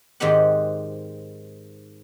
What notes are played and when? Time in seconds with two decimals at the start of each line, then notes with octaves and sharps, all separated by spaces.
0.20 G#2 D#3 C4 D#4 G4 F#5